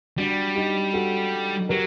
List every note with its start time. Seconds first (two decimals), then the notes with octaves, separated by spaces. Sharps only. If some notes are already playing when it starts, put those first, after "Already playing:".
0.18 G3 D4 F#4
0.55 D#4 G4
0.93 F#4 A4
1.69 F#3 G4 A#4